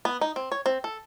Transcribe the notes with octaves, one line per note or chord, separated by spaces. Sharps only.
B3
D#4
C4
C#5
C4
A4